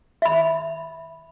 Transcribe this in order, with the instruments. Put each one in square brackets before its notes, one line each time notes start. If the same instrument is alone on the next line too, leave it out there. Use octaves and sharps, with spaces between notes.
[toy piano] E5 B5